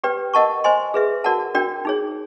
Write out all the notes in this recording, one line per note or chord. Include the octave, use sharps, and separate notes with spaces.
G4 B4 D5 G5
A#4 D#5 F#5 A5 C#6
C5 D#5 G#5 C6
G#4 B4 E5
F#4 A#4 D5 F#5 A5
D4 F#4 A#4 D5 G5
D#4 G#4 C#5